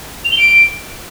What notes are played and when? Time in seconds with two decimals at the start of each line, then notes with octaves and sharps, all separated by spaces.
0.25 F7
0.32 G7
0.39 D7